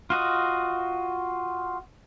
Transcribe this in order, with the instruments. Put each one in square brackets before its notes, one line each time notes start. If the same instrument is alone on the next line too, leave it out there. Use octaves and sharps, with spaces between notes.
[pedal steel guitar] F4 F#4 D#5